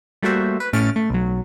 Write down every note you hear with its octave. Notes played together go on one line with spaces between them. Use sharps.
G3 A3 A#3 F#4 C5 E5
B4
A2 A3 C#4 F6 A6 D7
A3
B1 F#3